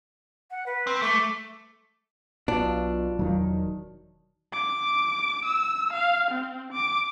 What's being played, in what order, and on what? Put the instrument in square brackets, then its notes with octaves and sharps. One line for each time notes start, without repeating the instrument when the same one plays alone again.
[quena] F#5
B4
[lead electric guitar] C4
[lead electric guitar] A3 [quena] D6
[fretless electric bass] B1 B2 [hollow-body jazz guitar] D4 [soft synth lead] F4
[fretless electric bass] E1 D#3 [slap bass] F#3
[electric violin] D6
E6
F5
C4
D6